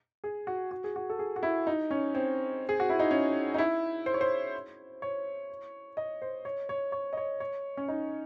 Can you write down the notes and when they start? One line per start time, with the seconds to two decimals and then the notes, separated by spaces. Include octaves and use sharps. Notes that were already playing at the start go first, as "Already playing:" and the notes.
0.24 G#4
0.47 F#4
0.71 F#4
0.84 G#4
0.96 F#4
1.10 A4
1.19 G#4
1.36 F#4
1.43 E4
1.67 D#4
1.91 C#4
2.15 C4
2.69 G#4
2.80 F#4
2.90 E4
3.00 D#4
3.11 C#4
3.54 D#4
3.58 E4
4.06 C5
4.14 C#5
4.21 C5
5.02 C#5
5.97 D#5
6.22 C5
6.45 C#5
6.69 C#5
6.92 C#5
7.13 D#5
7.17 C#5
7.40 C#5
7.77 C#4
7.88 D#4